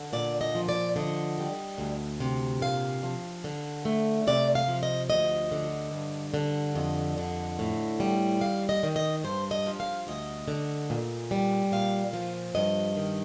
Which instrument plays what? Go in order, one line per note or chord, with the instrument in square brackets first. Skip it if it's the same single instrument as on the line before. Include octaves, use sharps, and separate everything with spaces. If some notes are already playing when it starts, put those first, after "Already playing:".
Already playing: [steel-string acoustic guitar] D3
A#2 D5
D#5
F3
D5
D3 D#5
G3
D2
C3
A#2 F5
F3
D3
A3
C3 D5
F5
F3
D#5
D2 D#5
D3
G2
D3
F2 D#5
D3
A2
G3
D#2 F5
D#5
D#3
D#5
G2 C5
D#5
F3
F5
D2 D#5
D3
A#2
G3
A#2 F5
F3
G2 D#5
D#3